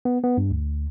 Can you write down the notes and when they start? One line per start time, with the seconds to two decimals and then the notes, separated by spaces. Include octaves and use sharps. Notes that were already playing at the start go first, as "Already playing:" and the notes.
0.05 B3
0.24 B3
0.38 G2
0.51 D2